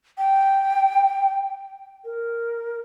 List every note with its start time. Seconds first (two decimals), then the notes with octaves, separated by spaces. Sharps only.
0.18 G5
2.05 A#4